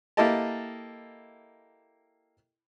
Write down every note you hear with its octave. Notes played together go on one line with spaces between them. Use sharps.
A#3 E4 G4 A4 D#5 A5